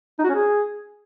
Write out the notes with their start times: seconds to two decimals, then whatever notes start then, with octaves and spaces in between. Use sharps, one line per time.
0.19 D#4
0.24 F#4
0.29 C#4
0.34 G#4